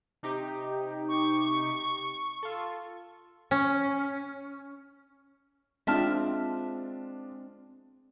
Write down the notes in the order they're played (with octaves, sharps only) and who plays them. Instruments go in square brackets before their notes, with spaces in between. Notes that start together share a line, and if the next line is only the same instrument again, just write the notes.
[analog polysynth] C3 D#4 G4
[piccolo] C#6
[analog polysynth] F4 A4
[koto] C#4
[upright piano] G#3 D4 F4 [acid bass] C4 [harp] E5 A5 F6